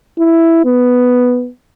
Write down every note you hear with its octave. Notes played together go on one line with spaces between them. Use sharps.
E4
B3